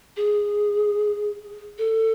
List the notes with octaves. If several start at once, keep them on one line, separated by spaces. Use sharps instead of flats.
G#4
A4